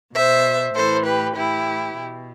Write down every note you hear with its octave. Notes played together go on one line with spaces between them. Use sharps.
B2 C5 E5
A2 E3 A4 C5
G4 B4
A2 E3 E4 G4
B2